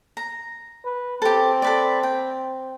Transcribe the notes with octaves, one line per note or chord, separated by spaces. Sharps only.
A#5
B4
C4 G4 A4
A4 B4 D5
G5